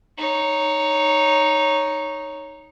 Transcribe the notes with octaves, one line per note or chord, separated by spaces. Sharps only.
D#4 C#5